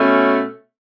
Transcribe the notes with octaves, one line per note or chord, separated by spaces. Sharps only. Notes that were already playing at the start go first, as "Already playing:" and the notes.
Already playing: B2 A3 C#4